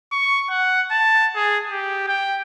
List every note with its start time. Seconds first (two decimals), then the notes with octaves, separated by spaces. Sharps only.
0.12 C#6
0.50 F#5
0.91 A5
1.36 G#4
1.70 G4
2.08 G5